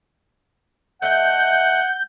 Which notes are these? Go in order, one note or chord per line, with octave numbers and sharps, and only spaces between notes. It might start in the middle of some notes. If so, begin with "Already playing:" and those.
A3 D#5 E5 F#5 G6